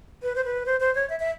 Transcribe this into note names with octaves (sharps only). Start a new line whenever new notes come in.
B4
C5
B4
C5
C5
C#5
E5
E5